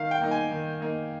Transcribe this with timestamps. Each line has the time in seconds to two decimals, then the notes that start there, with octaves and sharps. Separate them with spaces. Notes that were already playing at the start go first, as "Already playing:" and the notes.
Already playing: D#3 F5
0.11 G5
0.21 A#3 D#4
0.31 G#5
0.51 D#3
0.81 A#3 D#4